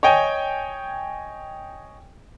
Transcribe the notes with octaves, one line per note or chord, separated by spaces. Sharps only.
C#5 D#5 G5 G#5